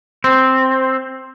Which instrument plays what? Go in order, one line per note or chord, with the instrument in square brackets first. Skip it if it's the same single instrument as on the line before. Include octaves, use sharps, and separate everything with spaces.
[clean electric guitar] C4